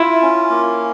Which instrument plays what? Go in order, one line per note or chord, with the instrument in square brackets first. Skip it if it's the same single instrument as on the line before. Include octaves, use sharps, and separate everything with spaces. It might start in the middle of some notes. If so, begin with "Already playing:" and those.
Already playing: [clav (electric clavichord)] E4 [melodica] F4
[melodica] C#4
A#3